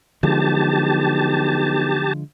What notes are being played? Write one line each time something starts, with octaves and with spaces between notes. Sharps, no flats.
B1 D3 F3 G#3 G4 A5